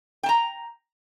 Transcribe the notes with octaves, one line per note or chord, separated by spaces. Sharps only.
G5 A5 A#5